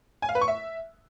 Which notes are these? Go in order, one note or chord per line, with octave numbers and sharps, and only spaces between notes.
G#5
F5
B4
C#6
E5